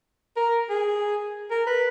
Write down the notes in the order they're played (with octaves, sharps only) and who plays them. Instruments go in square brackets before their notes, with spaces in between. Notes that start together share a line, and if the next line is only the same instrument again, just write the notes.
[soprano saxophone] A#4
G#4
A#4
B4